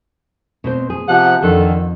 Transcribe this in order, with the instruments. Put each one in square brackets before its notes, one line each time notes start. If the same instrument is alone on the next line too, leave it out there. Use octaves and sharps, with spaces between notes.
[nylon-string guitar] B2 C4 C5
G#4
[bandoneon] C3 F3 F#6 [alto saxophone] F#5
[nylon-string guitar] F2 [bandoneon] D3 D#3 [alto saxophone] A4